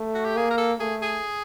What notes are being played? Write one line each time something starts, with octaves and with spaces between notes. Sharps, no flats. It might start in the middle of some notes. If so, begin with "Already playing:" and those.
Already playing: A3
F#4
G4
A#3 G#4
A#4
A4
A3 G#4
G#4